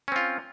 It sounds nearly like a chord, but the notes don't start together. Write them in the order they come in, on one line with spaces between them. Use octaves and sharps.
C#4 C4 F4